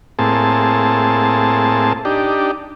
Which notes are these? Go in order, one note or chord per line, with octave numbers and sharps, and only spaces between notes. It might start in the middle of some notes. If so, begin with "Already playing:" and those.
A2 A#3 C4 G#4 A5
D4 D#4 G4